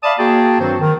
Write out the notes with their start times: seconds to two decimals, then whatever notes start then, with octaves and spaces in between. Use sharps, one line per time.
0.03 D5 E5 F5 A5 B5 D#6
0.18 A#3 F#4 G#4 G5 A5
0.60 G2 D#3 F#3 C4 F#4 C5
0.80 D#3